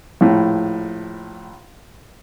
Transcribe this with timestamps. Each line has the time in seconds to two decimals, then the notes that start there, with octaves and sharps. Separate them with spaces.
0.21 A#1 A2